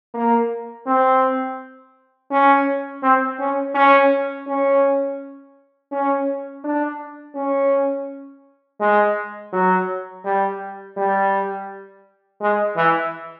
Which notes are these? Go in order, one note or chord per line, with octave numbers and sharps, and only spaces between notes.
A#3
C4
C#4
C4
C#4
C#4
C#4
C#4
D4
C#4
G#3
F#3
G3
G3
G#3
E3